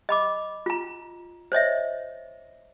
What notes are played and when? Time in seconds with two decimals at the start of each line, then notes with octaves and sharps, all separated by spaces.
0.09 D#5 B5 D6
0.66 F4 A#5
1.52 C5 C#5 D#5 E5